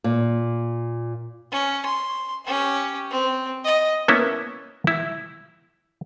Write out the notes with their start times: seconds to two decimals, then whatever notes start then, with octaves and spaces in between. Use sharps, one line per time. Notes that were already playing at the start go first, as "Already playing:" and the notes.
0.04 A#2
1.52 C#4
1.86 C6
2.45 C#4 G4
3.11 C4
3.65 D#5
4.08 A#3 B3 C#4 E4
4.87 E4